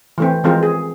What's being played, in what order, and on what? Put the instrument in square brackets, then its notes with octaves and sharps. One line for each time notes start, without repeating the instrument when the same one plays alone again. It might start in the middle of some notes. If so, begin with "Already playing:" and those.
[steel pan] E3 A3 C4
E3 F3 G#3 C4 F4 A#4
G#4